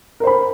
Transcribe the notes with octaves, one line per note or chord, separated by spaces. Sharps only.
A#4 C5 B5